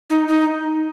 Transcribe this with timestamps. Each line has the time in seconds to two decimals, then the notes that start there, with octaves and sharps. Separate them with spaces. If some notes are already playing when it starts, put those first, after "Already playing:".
0.10 D#4
0.28 D#4